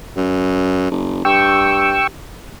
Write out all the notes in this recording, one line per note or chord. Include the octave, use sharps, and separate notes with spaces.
F#2
F#1
G2 G5 C#6 E6